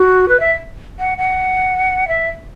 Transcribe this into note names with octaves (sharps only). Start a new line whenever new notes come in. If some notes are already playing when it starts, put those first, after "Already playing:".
Already playing: F#4
B4
E5
F#5
F#5
E5